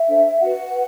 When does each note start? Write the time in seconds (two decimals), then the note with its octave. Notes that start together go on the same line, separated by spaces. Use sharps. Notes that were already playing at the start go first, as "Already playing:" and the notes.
Already playing: E5
0.08 D4 A4 C5
0.39 F#4 B4 F#5
0.71 B4